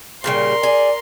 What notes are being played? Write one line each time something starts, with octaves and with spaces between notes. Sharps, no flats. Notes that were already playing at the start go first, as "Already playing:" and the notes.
A#2 C#3 G3 A#4 C6
G#4 D5